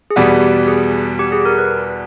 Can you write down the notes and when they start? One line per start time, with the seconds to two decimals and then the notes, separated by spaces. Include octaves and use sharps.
0.10 G#4
0.16 E2 B2 G3 B3 G4
0.42 G4
0.68 G#4
1.19 G4
1.32 G#4
1.46 A#4
1.58 B4